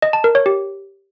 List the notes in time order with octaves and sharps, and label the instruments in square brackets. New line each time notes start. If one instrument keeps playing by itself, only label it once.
[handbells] D#5
A5
A#4
C#5
G4